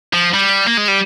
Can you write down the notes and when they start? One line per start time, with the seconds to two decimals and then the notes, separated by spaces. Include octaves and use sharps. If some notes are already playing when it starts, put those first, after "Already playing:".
0.13 F3
0.34 G3
0.67 A#3
0.77 G#3
0.88 G3